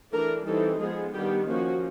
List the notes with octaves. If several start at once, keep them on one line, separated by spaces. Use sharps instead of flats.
E3 A3 D4 A#4
E3 G3 C4 D#4 A4
F3 G#3 B3 G#4
D#3 G3 B3 D4 G4
F3 A#3 C#4 F#4